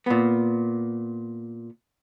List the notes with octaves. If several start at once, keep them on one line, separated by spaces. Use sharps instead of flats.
A#2 B3